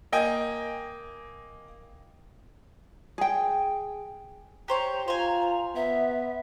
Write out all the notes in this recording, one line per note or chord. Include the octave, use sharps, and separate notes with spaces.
A#3 D#5 G5 G#5
G#4 G5
G4 C5 C#5 A#5
F4 C5 G#5
B3 E5